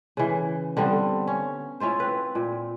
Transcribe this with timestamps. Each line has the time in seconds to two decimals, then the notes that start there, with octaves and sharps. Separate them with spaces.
0.17 C#3 E3
0.77 D3 G3 B3 C4
1.27 C#4
1.80 C#4 E4 F4 C5
2.00 C4 B4
2.35 A#2